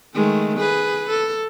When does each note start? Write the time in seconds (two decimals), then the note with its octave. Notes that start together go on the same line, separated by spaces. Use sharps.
0.14 D#3 G#3 A3
0.59 G#4 B4
1.09 A4